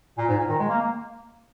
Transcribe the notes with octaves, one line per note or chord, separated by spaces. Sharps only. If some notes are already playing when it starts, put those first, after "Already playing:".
A#2
G#2
A#2
D#3
G#3
A#3
A#3